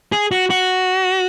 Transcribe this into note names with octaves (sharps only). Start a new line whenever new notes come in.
G#4
F#4
F#4